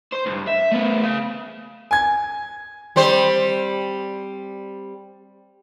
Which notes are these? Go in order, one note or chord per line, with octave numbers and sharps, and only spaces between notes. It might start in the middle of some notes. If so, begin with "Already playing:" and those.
C5
C#2 G2
E5
A3 B3
C#3 F5
G#5 G#6
G3 C4 C5